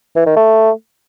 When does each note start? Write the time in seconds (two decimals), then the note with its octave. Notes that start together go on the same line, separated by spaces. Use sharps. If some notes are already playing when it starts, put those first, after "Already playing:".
0.16 E3
0.26 D#3
0.36 A3